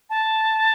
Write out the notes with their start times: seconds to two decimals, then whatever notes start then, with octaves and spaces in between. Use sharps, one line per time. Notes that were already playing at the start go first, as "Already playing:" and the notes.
0.10 A5